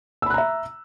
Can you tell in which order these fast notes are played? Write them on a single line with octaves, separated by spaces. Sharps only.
E6 B5 F#6 A#5 E5